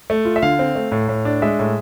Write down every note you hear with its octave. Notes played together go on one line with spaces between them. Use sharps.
A3
F4
E5
D3 F5
C4
A3
A2
A2
D4
G#3 E5
A2